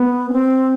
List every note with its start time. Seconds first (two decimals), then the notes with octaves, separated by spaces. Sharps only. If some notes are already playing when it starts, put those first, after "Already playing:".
Already playing: B3
0.29 C#4
0.33 C4